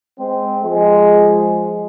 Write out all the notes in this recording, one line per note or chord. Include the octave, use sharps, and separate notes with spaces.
G#3 C4
F3 G#3